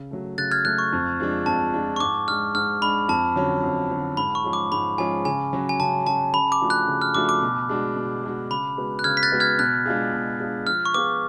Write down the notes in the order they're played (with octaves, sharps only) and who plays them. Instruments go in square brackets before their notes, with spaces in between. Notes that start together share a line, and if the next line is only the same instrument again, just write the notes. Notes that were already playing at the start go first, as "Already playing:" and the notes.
Already playing: [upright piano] C#3
F#3 A3
[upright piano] C#3 [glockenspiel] F#6 A6
[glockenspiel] F6 G#6
[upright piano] F#3 A3 [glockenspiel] F#6
[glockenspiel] C#6
[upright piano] F2
F3 G#3 D4
[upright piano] F2 [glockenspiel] A5
[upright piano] F3 G#3 D4
[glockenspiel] C#6
[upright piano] G#2 [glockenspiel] D6
[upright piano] D4 [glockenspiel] F6
[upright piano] G#3
[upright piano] G#2 [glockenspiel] F6
[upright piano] G#3 D4 [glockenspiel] B5
[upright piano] F2 [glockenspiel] A5
[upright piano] D3 F#3 C#4
F2
D3 F#3 C#4
[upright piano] G#2 [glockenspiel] B5
[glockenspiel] C#6
[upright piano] F3 G#3 C#4 G#4
[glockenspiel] D6
[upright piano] G#2 [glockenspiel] B5
[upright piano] F3 G#3 C#4 G#4 [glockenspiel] G#5
[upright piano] C#3 [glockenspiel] G#5
[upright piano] F#3 C#4 F#4
[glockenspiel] G#5
[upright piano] C#3 [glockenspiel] A5
[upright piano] F#3 C#4 F#4 [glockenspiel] A5
[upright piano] C#3 [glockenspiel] B5
[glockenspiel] D6
[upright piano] F3 A3 D4 F#4
[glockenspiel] F#6
[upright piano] C#3
[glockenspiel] F6
[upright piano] F3 A3 D4 F#4 [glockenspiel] D6
[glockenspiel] D6
[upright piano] B2
G#3 D4 F#4
B2
G#3 D4 F#4
[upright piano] C#3 [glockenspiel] B5
[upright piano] G#3 B3 F#4
[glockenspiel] F#6
[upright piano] C#3 [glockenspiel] F6 G#6
[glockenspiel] B6
F#6 A6
[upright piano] G#3 B3 F#4
[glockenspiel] F6 G#6
[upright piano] B2 [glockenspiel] F#6
[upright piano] G#3 D4 F4 G#4
B2
G#3 D4 F4 G#4
[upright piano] F3 [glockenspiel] F6
[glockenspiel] C#6
[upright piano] B3 F4 G#4 [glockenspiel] D6